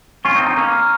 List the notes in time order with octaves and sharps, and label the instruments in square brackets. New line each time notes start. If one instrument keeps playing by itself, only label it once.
[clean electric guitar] C#4 F4 [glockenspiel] C#6
[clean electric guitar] C4 D#4
[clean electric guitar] C4 D#4 [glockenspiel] A#5
[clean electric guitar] A#3 C#4
[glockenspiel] F6